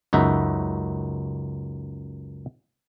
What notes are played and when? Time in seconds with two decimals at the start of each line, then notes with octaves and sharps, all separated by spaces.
0.13 C#2 F#2 D#4 F#4 E5